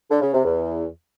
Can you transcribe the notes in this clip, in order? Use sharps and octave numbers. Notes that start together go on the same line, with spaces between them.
D3
C#3
C3
E2